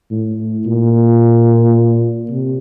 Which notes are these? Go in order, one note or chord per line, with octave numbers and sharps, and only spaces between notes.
A2
A#2
C3